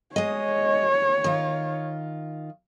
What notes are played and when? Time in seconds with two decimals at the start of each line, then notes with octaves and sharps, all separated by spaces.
0.16 G#3 C#5 D#5
1.24 D#3 F4